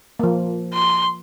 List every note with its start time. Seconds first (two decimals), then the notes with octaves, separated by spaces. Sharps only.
0.19 F3 A#3
0.74 C6